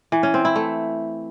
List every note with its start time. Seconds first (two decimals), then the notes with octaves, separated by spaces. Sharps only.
0.12 E3
0.23 C#4
0.34 C4
0.45 E4
0.56 A3